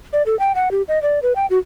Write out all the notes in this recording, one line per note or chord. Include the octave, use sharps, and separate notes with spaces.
D5
A4
G5
F#5
G4
D#5
D5
B4
G5
F#4